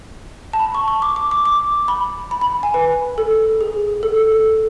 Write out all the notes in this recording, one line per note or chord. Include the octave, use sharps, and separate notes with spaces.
A5
B5
C#6
C#6
D6
D6
D6
D6
B5
B5
B5
G#5
B4
A4
G#4
A4
A4
A4